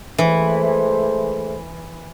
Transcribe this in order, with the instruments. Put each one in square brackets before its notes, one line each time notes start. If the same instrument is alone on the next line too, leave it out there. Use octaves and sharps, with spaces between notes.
[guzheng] E3 [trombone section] G#3 A3 C5